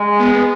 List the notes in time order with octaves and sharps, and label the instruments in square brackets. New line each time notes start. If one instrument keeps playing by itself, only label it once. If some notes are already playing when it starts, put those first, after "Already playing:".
Already playing: [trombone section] G#3
[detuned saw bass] B3